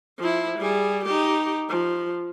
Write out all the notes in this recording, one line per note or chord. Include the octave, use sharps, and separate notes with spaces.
F3 E4
G3 G#4
D#4 G4
F3